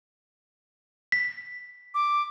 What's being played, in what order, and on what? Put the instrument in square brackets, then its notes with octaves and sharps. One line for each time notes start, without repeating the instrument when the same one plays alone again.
[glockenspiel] B6
[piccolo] D6